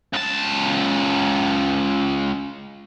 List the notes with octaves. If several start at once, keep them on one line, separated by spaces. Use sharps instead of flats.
C#2 A5